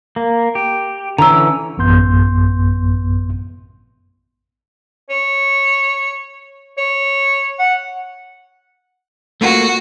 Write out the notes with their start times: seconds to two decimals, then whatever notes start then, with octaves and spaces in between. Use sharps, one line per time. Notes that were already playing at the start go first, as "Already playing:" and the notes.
0.16 A#3
0.55 G4
1.18 D3 E3 C#4 A#5 E6
1.78 A1 F#2 B3 C6 G6
5.10 C#5
6.78 C#5
7.60 F#5
9.41 A3 A#3 F4 F#4